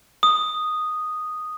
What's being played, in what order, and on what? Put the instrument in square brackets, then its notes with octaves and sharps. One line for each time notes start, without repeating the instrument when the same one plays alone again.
[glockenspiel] D#6